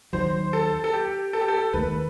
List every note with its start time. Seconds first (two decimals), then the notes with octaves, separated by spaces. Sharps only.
0.13 D#2 D#3 F#3 C5
0.53 A4
0.84 A4
0.93 G4
1.33 A4
1.41 G4
1.48 A4
1.73 D#2 D#3 A3 B4